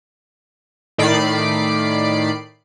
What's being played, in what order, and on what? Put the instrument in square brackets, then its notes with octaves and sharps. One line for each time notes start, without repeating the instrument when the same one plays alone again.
[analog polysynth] A2 D#3 D5 B5 C7 D7